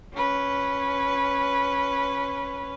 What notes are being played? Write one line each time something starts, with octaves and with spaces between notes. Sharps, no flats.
C#4 B4